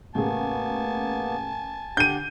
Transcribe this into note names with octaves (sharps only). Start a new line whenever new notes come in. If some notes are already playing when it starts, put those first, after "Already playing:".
A1 C#3 A#3 B3 G#4 G#5 A5
D3 G4 F#5 G6 D#7